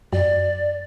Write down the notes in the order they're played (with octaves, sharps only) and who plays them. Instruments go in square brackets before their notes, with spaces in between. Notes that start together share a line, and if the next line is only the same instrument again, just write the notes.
[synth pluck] F#2 [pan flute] D5